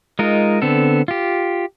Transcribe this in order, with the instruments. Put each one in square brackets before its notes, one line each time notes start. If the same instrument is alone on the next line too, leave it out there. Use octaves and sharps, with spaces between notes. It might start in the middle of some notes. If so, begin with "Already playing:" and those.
[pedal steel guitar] G#3 D#4 F4 A#4
D3 B3 C4 A4
F4 G4